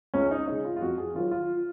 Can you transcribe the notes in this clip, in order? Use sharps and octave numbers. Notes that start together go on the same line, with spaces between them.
C#2 C#4
D#4
C#3 G#3 D#4
F4
F4
F2 F#4
G#4
D#3 F#3 F4
F4